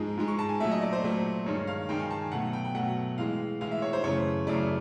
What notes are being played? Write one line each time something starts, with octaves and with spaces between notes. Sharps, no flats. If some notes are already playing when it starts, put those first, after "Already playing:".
Already playing: G#2 F3 G#3
G#2 F3 G#3
C#6
A5
G#5
A#2 F#3 A3 E5
D#5
D5
C5
A#2 F#3 A3
G2 D#3 G#3 C#5
F5
G2 D#3 G#3 G5
G#5
A5
G#5
B2 F#3 A3 F#5
G5
G5
B2 F#3 A3 F#5
A2 E3 G#3 F5
A2 E3 G#3 F5
E5
C#5
C5
F#2 C#3 E3 A3 C#5
F#2 C#3 E3 A3 D5